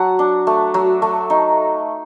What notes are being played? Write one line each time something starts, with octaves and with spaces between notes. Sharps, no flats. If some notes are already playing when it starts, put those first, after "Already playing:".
Already playing: F#3 F#5 A5
D4
A3
F#3
A3
D#4